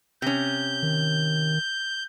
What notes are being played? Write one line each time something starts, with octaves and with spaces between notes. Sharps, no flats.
C3 C#4 G6
D#3